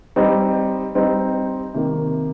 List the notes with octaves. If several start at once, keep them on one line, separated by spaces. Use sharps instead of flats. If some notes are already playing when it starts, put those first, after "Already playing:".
G3 C4 D#4
G3 C4 D#4
C3 D#3 A#3